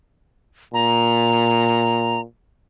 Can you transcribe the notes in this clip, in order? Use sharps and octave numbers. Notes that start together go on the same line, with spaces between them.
A#2 A#5